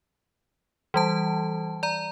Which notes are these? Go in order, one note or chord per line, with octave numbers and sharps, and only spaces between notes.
E3 G3 A5
D5 A#5